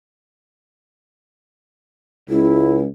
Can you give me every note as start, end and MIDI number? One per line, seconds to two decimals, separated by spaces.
2.29 2.84 37
2.29 2.77 64